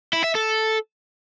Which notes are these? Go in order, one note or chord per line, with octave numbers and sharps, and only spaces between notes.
E4
E5
A4